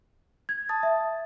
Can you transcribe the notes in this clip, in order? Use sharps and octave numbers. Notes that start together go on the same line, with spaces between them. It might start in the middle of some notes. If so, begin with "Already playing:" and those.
G#6
A5 D#6 A6
E5